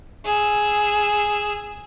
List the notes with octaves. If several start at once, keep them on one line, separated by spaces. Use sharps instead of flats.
G#4 E6